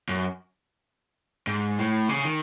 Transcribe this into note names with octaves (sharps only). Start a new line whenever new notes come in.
F#2
G#2
A2
C#3
D#3